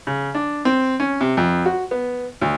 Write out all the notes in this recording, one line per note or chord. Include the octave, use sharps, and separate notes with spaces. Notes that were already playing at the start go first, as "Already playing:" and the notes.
C#3
D4
C4
C#4
C3
F2
F#4
B3
D2